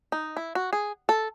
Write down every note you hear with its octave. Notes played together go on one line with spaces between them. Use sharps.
D#4
E4
F#4
G#4
A4